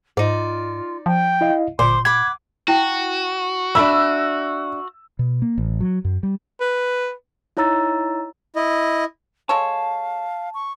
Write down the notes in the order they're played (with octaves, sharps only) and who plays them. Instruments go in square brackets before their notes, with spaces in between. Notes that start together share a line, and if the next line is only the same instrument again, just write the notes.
[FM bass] G#2 [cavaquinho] D#4 D5 [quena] F4
[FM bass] F3 [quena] G5
[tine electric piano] E4 D#5 F5
[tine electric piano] G1 D6 [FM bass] A#2 [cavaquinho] C5 [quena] C6
[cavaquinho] F#5 B5 [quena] D6 [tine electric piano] G#6
[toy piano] E4 G5 [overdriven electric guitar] F#4
[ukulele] D4 E5 B5 [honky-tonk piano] E6
[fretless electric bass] B2
A#3
A1
F#3
F#2
G3
[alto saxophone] B4
[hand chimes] D#4 E4 C#5 A#5 E6 A6
[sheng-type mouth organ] E4 D#5
[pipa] G#3 A4 C#5 [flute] F5 [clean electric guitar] A5
[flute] C#6